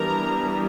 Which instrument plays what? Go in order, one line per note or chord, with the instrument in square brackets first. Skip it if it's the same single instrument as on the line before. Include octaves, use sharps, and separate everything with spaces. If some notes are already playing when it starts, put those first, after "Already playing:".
Already playing: [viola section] E3 G3 B3 D4 A#4 A#5